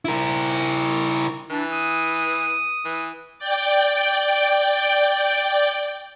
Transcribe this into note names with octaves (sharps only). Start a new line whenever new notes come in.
E4 A#4
E3 D4
D#6
E3
D5 G5